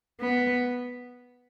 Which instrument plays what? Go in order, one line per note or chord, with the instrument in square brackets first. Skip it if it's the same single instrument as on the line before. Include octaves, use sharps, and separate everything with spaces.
[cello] B3